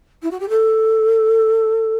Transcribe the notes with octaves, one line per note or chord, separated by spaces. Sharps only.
E4
F#4
G4
A4